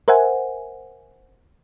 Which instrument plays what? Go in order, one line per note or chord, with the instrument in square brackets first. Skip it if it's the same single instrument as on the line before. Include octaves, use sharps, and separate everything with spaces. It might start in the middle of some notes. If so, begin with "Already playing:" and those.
[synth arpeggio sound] A#4 C5 E5 F#5 G#5